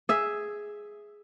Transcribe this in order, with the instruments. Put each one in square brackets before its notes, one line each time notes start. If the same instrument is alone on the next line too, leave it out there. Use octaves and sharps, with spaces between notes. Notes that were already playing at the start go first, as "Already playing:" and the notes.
[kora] G#4 E5